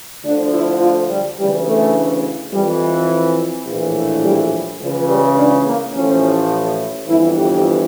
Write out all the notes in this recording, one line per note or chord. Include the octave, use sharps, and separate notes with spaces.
D2 D3 F3 D4
E4
F4
G3
D2 C#3 E3 G3
A3
F2 E3 G3
A#1 A2 E3
G3
C#2 C#3 E3 F3
G3
D4
A#3
A1 A2 F3 C#4
G1 F2 E3 E4
G4